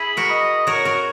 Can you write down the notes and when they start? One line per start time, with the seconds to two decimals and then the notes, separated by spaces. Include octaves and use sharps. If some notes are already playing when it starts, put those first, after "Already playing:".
Already playing: E4 G#4 B5
0.17 F#4 A#4
0.30 D#5
0.67 F#4 A#4 C#5
0.85 F#4 A#4